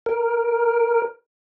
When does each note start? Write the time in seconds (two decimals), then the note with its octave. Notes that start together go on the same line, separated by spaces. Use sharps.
0.06 A#4